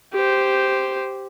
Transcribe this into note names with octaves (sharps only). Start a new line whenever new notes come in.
G4 C5